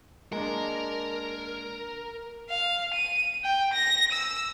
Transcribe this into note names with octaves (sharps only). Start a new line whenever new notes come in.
G#3 A#3 D4 A#4
F5
D#7
G5
A#6
E6